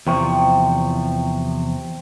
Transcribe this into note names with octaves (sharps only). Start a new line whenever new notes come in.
E2 C3 F3 C4 C#6